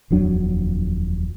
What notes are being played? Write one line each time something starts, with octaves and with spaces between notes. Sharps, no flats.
D#1 F2 F#3 D4